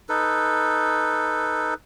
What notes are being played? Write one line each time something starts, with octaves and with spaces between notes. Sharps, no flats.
D#4 A4 B4